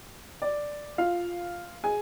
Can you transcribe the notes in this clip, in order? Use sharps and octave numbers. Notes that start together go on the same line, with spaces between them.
D5
F4 F5
G#4 G#5